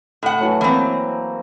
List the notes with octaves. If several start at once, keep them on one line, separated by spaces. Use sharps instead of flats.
A2 A4 F#5
E3 F#3 A3
E3 A#3 C4